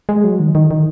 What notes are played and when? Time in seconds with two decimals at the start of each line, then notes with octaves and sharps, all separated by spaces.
0.09 G#3
0.24 F#3
0.40 D#3
0.55 D#3
0.71 D#3